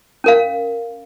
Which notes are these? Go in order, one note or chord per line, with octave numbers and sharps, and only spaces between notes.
C#4 A#4 F5